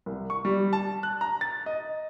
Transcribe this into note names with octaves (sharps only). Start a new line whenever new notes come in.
C2
C#6
G3
A5
F#6
A#5
A6
D#5